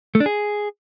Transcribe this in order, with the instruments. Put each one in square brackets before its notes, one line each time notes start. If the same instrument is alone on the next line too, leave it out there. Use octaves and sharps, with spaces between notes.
[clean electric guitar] A3
D4
G#4